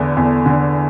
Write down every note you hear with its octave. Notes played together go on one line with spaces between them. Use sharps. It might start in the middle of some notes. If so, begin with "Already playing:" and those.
Already playing: E2 D3 A3
E2
D3